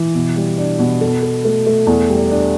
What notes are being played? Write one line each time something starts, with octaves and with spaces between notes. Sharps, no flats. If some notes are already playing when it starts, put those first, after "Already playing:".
Already playing: E3
B2
G3
D4
B2
A4
A4
A3
A3
E2
G3
D4